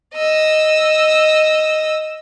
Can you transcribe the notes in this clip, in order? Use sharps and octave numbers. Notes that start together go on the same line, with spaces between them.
D#5 E6